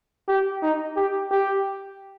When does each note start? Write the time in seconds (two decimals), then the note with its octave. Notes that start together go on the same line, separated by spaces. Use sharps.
0.28 G4
0.62 D#4
0.97 G4
1.31 G4